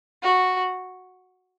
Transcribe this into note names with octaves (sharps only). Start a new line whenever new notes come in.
F#4